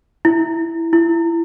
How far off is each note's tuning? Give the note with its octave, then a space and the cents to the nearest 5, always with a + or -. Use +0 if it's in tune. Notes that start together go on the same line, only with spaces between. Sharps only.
E4 +5
E4 +25